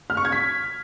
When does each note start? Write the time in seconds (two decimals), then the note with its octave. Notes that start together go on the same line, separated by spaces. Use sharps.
0.10 F6
0.17 C#6
0.25 G#6
0.32 B6